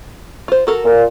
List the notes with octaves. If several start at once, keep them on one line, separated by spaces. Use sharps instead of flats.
F4 C5
F#4 A4 A#4
A#2